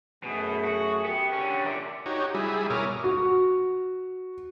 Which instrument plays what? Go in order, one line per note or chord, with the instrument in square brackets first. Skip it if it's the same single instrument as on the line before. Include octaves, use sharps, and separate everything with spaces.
[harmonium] F#2 A3 G#4 [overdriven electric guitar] B2
[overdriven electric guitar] F#4
[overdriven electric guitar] B3 [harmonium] G4
[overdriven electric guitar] D3 C#4
[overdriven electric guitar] A#4 D5 [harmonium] E5
[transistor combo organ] D#4 F#4 G4 C#5
G3 E4 G#4
B2 A#4 C#5 D6 D#6 F6
[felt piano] F#4